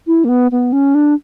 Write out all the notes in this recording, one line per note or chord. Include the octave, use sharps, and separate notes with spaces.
E4
A#3
B3
B3
C#4
D4